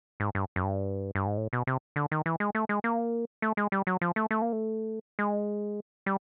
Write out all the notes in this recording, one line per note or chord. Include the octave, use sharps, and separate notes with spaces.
G#2
G2
F#2
G2
G2
G#2
A2
B2
C3
D3
D#3
E3
G#3
A3
G#3
A#3
A3
G#3
G3
F#3
F3
A3
A3
A#3
A3
G#3
G3